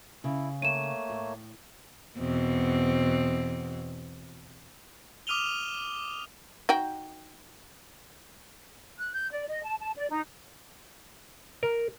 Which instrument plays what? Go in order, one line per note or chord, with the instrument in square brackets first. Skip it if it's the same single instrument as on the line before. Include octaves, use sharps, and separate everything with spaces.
[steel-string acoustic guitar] C#3 [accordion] E4
[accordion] A3 A#3 C#5 [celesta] D#7 E7
[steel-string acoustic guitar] A2
[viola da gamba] E2 B2 C4
[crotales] D6 D#6 F6 D#7 F7 G7
[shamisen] D#4 F#4 G5
[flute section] F#6
G6
D5
D#5
A5
A5
D5
D#4
[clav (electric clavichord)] A#4